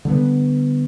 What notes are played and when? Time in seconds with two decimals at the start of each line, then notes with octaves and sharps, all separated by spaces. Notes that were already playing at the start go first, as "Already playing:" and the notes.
0.05 D3 G3 B3